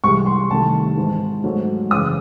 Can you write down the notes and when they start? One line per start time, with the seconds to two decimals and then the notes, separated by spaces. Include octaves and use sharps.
0.04 C2 C3 E3 G#3 C#6
0.26 C6
0.50 C2 C3 D#3 A3 A5
0.97 G#2 E3 G#3
1.44 G#2 F#3 A3
1.91 F#2 C#3 E3 D#6